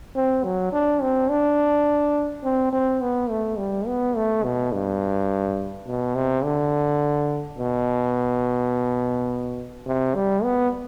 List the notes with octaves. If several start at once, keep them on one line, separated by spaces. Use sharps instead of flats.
C4
F#3
D4
C4
D4
C4
C4
B3
A3
G3
B3
A3
B2
G2
B2
C3
D3
B2
C3
G3
B3